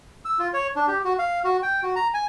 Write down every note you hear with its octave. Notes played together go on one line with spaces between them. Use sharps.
E6
F4
C#5
D4
G4
F#4
F5
F#4
G5
F#4
A#5
G#5